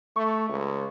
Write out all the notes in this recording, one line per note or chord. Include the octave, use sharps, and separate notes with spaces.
A3 C#6
C#2